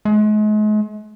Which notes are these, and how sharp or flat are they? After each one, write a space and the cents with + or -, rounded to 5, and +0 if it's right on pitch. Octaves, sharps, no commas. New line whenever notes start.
G#3 +40